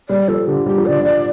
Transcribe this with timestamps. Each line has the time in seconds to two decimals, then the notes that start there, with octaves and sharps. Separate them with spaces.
0.09 G3 D5
0.28 F3 A4
0.47 D3 G4
0.66 G3 G4
0.78 F3
0.86 D3 D5
1.00 F3 D5